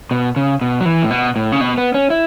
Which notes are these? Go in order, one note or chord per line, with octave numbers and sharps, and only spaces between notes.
B2
C#3
B2
F#3
E3
A2
B2
A2
C#3
B2
B3
C#4
E4